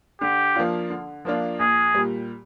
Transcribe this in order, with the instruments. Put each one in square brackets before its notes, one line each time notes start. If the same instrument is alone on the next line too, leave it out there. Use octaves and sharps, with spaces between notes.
[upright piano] D3 [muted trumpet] G4
[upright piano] F3 A#3 D4 F4
D3
F3 A#3 D4 F4
[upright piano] A#1 [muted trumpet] G#4
[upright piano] A#2 G3